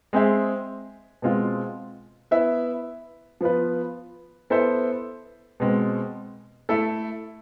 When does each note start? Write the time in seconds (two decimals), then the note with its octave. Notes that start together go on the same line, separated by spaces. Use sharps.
0.13 G#3 C4 G#4 C5 E5
1.22 B2 G#3 C4 F4
2.31 B3 E4 B4 E5
3.41 F3 B3 F4 B4
4.50 B3 E4 A4 C5 E5
5.60 B2 G#3 C4
6.69 A3 E4 A4